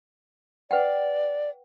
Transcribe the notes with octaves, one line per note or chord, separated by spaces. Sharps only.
B4 D5 F#5 G5